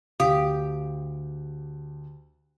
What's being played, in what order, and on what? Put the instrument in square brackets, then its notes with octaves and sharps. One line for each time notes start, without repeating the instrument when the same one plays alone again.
[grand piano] D2 [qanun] G4 [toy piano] F5 D#6